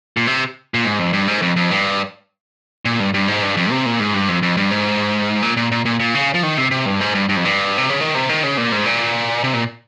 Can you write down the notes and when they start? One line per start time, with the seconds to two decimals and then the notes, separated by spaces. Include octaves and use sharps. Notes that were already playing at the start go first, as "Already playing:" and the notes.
0.17 A#2
0.27 C3
0.74 A#2
0.85 G#2
0.99 F2
1.13 G2
1.28 G#2
1.42 F2
1.56 F2
1.71 G2
2.85 A#2
3.00 G2
3.14 G2
3.28 G#2
3.42 G2
3.57 F2
3.70 C3
3.86 A#2
4.00 G#2
4.14 G2
4.28 F2
4.42 F2
4.57 G2
4.71 G#2
5.42 A#2
5.57 A#2
5.71 A#2
5.85 A#2
6.00 A#2
6.15 C#3
6.35 F3
6.43 D#3
6.58 C3
6.71 C3
6.86 G2
7.01 G#2
7.15 G2
7.29 G2
7.37 F2
7.45 G2
7.78 C3
7.90 C#3
8.01 D#3
8.15 C3
8.29 D#3
8.43 C#3
8.57 A#2
8.72 G#2
8.86 A#2
9.44 C3
9.54 A#2